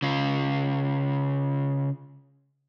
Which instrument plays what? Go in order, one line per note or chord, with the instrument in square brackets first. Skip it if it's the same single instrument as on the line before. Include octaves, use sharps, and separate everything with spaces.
[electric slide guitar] C#3 F4